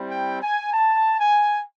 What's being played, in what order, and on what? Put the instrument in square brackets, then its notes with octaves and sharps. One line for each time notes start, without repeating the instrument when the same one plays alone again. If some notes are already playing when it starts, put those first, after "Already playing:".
Already playing: [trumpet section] G3 C4 E4
G5
G#5
A5
G#5